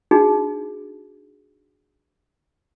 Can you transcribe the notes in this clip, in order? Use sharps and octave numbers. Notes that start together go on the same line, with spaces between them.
D4 D#4 F#4 G#4